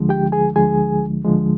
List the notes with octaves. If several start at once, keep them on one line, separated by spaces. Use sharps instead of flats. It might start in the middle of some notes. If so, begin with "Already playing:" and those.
Already playing: D2 D3 F3 G#3
G4 G5
G#4 G#5
D2 D3 F3 G#3 G#4 G#5
D2 D3 F3 G#3